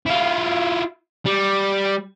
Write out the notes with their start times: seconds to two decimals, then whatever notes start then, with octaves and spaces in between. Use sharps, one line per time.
0.06 E4 F4
1.26 G3